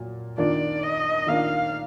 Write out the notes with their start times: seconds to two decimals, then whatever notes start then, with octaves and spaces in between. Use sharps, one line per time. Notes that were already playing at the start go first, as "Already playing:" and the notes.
Already playing: A#2 F#3
0.38 D#3 A#3 D4 F4 D5
0.83 D#5
1.27 D#3 A#3 D4 F4 F5